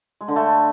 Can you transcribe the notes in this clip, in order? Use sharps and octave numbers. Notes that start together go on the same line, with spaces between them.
G#3
D3
A3